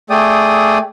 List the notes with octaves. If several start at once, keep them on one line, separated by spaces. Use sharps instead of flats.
A3 G#4 D5 G5 D#6